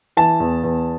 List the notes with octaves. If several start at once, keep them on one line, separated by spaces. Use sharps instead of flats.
E3 A5
E2
E2